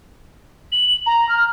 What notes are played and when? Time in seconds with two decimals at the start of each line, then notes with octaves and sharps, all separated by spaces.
0.71 F#7
1.06 A#5
1.28 F6